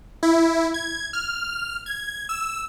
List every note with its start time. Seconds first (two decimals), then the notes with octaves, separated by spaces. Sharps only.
0.23 E4
0.74 G#6
1.13 F6
1.86 G#6
2.29 E6